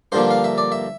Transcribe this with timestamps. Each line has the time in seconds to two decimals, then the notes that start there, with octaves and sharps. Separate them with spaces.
0.12 G2 D3 F3 A#3 C5
0.31 F5
0.44 E5
0.58 D5
0.72 E5